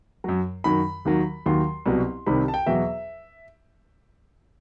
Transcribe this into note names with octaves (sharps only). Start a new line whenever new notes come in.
F#2 F#3
F#2 D#3 F#3 B5
D#2 D#3 F#3
D#2 D#3 F#3 C6
C2 B2 F#3
C2 C3 D#3 B5
A5
G5
E2 B2 F#3 E5